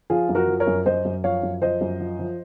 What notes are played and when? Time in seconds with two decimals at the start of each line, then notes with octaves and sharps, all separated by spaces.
0.10 F3 F4 G#4
0.29 F#2
0.35 F#4 A#4
0.48 F3
0.60 A#4 C#5
0.67 F#2
0.86 F#2 C5 D#5
1.05 F#2
1.24 F3 C#5 F5
1.43 F#2
1.62 F3 C5 D#5
1.81 F#2
2.00 F3
2.19 F3